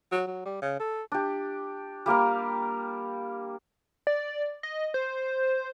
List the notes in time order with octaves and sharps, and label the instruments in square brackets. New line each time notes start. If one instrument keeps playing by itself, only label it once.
[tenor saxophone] F#3
F#3
G3
C#3
A4
[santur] D4 G4
G3 A#3 A#4 F5
[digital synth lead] D5
D#5
C5